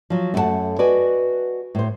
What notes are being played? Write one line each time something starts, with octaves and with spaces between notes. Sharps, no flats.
F3 F#3
F#2 A3 C4 A4 F#5 A5
F#4 B4 D5 D#5 G#5
A2 C5